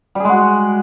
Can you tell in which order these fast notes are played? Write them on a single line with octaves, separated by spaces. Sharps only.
G3 G#4 G#3 F#4